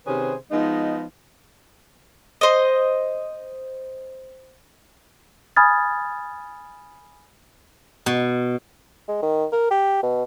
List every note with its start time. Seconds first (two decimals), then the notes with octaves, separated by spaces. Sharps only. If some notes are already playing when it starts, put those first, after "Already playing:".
0.07 C3 D#3 C#4 G#4 B4 C5
0.51 F3 G#3 B3 D#4
2.41 C5 D#5
5.56 G#5 B5 D#6 F6 G#6 A6
8.06 B2
9.08 G#3
9.23 D#3
9.52 A#4
9.71 G4
10.03 B2